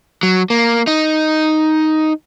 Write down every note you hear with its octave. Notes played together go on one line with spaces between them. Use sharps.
F#3
A#3
D#4